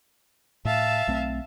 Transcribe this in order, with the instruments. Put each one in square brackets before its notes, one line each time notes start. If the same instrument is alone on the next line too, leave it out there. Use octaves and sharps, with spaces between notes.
[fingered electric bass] A2 [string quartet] E5 F5 A5
[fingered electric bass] B1 A3 C4